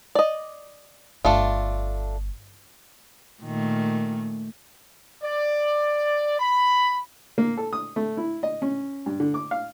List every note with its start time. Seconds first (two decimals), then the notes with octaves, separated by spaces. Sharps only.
0.15 D5 D#5
1.25 G1 A3 D4 F4
3.43 A#2 D#3 A3
5.23 D5
6.40 B5
7.38 A#3
7.58 A4
7.73 D#6
7.96 A3
8.17 E4
8.43 D#5
8.62 C#4
9.06 G2
9.20 D3
9.34 D6
9.51 F5